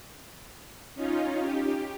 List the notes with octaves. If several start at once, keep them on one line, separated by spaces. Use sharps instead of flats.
C#4 D#4 F4
G4